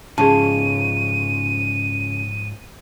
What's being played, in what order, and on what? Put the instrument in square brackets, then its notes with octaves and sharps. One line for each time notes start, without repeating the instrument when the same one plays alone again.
[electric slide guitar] G#2 F3 C#4 [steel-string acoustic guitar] C#3 [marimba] G#4 A5 [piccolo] D#7